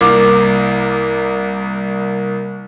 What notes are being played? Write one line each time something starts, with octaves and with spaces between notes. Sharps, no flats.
C2 A#3 D6